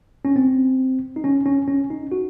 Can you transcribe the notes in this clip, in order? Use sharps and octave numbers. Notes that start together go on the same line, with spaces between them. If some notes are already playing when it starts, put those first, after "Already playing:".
C#4
C4
D#4
C#4
C#4
C#4
D#4
F#4